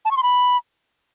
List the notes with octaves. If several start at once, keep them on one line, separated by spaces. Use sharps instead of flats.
A5
C#6
C6
B5